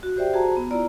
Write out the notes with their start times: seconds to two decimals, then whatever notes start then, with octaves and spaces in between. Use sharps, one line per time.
0.03 F#4
0.17 G4 C5 D5 E5 G5
0.34 F#4 G#4 C5 A5 A#5
0.57 B3
0.71 E4 F4 D5 A#5